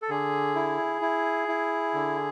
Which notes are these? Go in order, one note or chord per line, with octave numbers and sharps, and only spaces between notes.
A4
D3 G#4
E4
E4
E4
D3